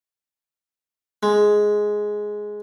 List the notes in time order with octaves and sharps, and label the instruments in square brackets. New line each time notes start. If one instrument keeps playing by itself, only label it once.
[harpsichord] G#3